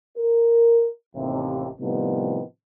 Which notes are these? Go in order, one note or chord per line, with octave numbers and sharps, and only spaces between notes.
A#4
A1 D#2 C3
A2 C3 D#3 F3 G3 B3